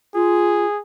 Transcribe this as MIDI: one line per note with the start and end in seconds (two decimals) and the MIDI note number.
0.15 0.66 65
0.15 0.80 68